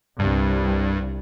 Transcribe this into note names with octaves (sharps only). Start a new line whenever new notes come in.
C2 G2 G3